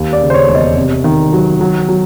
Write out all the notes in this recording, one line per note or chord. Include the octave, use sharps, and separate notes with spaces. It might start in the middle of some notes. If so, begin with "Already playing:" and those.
Already playing: D#2
D5
C#3
C5
C#5
E1
D#5
C3
D#3
F#3
F#3
F#3